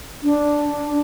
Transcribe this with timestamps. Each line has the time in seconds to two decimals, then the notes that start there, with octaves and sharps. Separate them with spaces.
0.23 D4